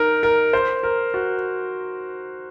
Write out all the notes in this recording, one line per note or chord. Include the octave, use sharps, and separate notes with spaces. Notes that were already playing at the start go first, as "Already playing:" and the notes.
Already playing: D#4 A#4
A#4
C5
A#4
F#4